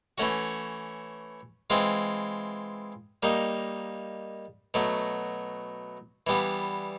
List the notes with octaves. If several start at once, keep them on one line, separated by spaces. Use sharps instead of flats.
E3 A3 C#4 F#4
E3 G#3 C4 F4
G3 A#3 D#4
B2 F#3 A3
E3 G3 B3 D4